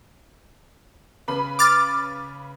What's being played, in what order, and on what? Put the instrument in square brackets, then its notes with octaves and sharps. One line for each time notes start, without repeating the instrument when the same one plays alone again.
[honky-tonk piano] C#3 B4 B5
[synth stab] D6 F6 A6